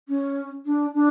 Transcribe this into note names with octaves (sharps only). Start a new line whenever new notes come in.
C#4
D4
D4